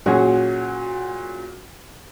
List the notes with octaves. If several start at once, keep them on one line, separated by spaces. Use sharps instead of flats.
A#2 F#3 C#4 F#4 G#4